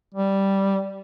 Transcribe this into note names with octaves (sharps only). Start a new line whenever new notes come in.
G3